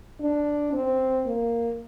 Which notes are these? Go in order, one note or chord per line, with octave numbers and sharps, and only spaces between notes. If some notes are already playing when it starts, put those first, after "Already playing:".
D4
C4
A#3